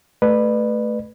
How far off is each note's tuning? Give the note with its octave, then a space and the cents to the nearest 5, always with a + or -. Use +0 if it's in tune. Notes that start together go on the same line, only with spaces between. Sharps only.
A3 +0 B4 +0 D5 +40